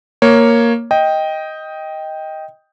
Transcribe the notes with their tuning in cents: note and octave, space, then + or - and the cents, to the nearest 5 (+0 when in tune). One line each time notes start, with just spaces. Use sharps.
A#3 +0 C#5 +0
D#5 +10 G5 +0